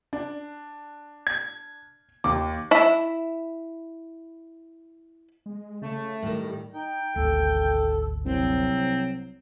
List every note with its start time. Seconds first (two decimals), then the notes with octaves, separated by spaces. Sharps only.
0.13 D4
1.27 G#6
2.24 D#2 D6
2.71 E4 E5
5.46 G#3
5.82 C#3 A3
6.22 A2 D#3 G3
6.73 D#4 G5
7.16 G#1 D2 A4
8.25 C2 F#3 C4